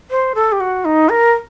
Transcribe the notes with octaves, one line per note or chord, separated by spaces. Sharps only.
C5
A4
G4
F#4
D#4
A#4